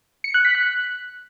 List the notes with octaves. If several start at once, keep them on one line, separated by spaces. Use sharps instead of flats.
C#7
F#6
B6
F#6